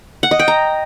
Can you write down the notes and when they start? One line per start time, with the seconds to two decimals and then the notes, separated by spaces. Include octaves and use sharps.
0.23 F#5
0.31 D#5
0.39 G5
0.48 A#5